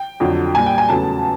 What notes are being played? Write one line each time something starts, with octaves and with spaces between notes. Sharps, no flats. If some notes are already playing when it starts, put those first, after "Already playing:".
Already playing: G5
F2 D3 F#3
A#2 G3 G#5
G5
G#5
E2 C#3 F#3 A3 A5